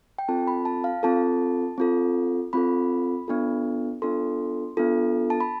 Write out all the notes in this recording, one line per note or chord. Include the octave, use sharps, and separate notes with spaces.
G5
C4 F4 A4 A5
B5
A5
F5
C4 F4 A4 A5
C4 F4 A4
C4 F4 A4 B5
B3 D4 F4 A4
B3 D4 F4 A4 C6
B3 D4 F4 A4
A5
B5